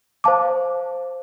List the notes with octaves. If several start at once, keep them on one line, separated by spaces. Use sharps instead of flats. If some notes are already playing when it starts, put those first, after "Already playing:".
C5 F5 A5 D6